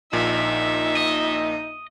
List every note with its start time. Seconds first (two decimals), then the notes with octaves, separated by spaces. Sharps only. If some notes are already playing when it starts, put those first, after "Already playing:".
0.13 A#1 A#2 D#4 E5
0.97 D#5